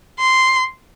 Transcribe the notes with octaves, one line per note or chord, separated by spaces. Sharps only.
C6